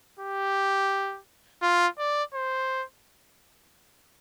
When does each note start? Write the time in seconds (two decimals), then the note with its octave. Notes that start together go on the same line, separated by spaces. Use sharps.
0.20 G4
1.62 F4
1.99 D5
2.34 C5